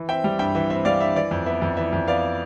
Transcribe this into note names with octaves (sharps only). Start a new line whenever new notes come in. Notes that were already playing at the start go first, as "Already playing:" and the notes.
Already playing: E3
C4 E5 G5
G3
G2 E5 G5
E3 E5
C4 E5
G3 D5 F5
G2 E5
E3 D5
F2
B3 E5
F2
E3 E5
F2
B3 D5 F5